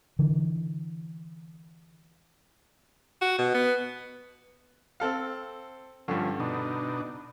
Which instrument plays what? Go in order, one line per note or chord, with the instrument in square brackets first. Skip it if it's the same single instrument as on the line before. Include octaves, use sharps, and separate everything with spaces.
[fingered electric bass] D3 E3
[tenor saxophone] F#4
B2
B3
[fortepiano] C4 A4 F5
[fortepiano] G2 D3 [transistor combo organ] F3 C#4
[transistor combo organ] B2 D4 D#4